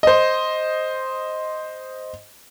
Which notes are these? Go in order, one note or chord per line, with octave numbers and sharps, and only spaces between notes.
C5 D#5